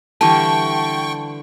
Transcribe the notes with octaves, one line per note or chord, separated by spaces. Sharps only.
D3 E3 G3 G5 A5 C#6